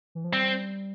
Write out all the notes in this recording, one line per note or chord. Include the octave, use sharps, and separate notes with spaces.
E3
F3
G3 C4